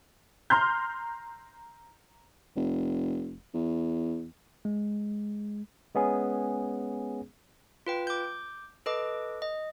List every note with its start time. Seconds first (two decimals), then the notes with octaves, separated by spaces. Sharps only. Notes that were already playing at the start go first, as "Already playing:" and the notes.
0.50 A#5 C6 F6 G6
2.56 F1
3.54 E2
4.65 G#3
5.95 G#3 B3 C#4 G#4
7.87 F4 B4 G5
8.07 D6 G6
8.86 A4 B4 D#5 D6
9.42 D#5